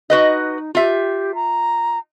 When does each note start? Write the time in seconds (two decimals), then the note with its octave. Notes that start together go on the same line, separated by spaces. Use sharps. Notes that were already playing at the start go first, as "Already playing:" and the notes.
0.10 D#4 F#4 B4 D#5
0.75 F4 G4 E5
1.35 A#5